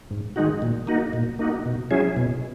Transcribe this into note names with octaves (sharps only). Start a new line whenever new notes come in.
G#2
D#3 G#3 D#4 F#4
A#2
A#3 D#4 F#4
A#2
A#3 D#4 F#4
B2
F#3 C#4 E4 G#4
B2